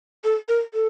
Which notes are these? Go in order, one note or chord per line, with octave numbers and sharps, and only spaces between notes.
A4
A#4
A4